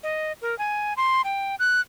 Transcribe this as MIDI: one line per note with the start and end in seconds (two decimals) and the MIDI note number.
0.03 0.32 75
0.42 0.57 70
0.58 0.93 80
0.97 1.21 84
1.24 1.55 79
1.59 1.80 90